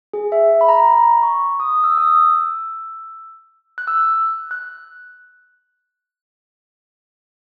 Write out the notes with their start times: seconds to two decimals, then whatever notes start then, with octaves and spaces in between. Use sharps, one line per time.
0.14 G#4
0.32 E5
0.61 B5
0.69 A#5
0.80 A#5
0.86 B5
1.23 C#6
1.60 D#6
1.84 E6
1.98 D#6
2.08 E6
3.78 F#6
3.87 E6
3.97 F#6
4.51 F#6